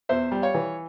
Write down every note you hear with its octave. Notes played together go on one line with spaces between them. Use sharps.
E2 C5 E5
G3
C#5 F5
E3